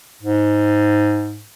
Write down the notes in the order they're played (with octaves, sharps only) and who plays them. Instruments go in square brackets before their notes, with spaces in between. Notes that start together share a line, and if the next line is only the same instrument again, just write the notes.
[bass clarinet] G#2